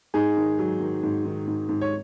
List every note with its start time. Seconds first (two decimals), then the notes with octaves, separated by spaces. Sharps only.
0.14 G#2 D#4 G#4
0.37 D#3
0.59 F#3
0.80 D#3
1.03 G#2
1.25 D#3
1.47 G#2
1.69 G#2
1.81 C#5